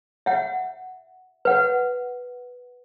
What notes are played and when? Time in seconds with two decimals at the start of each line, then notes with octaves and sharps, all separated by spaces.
0.26 E5 F#5
1.45 B4 F#5